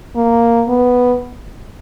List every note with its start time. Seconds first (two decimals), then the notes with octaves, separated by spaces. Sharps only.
0.16 A#3
0.68 B3